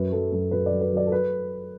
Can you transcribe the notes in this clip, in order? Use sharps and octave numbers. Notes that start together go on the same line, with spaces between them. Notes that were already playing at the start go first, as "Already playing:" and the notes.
Already playing: F#2 B4
F#3 A4
F#2 A4
F#2 B4
D5
F#3
B4
F#3 D5
A4
B4